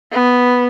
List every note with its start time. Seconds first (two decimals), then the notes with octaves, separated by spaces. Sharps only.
0.12 B3